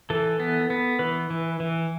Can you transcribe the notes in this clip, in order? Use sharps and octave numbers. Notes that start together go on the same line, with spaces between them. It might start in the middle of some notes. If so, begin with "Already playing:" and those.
E3 A4
B3
B3
E3 B4
E3
E3